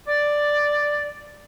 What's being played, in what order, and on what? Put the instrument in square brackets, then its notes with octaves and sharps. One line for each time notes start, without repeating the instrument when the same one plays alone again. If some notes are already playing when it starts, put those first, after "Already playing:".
[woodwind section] D5